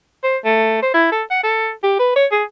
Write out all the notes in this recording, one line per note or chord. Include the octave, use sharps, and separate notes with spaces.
C5
A3
C5
E4
A4
F#5
A4
G4
B4
C#5
G#4